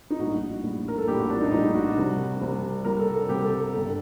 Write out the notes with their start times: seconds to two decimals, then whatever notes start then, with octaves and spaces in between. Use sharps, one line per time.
0.10 D#4
0.19 A#1 A2 G3 F#4
0.63 A#1 A2 G3
0.88 A#4
0.98 A4
1.07 A#1 A2 G3 G4
1.19 F#4
1.30 D4
1.40 D#4
1.51 A#1 A2 G3 D#4
1.74 F#4
1.97 C2 C3 G3
2.40 C2 C3 G3
2.85 C2 C3 G3 A#4
2.99 A4
3.14 A4
3.29 C2 C3 G3 G4
3.44 A4
3.73 G1 G2 D3 A4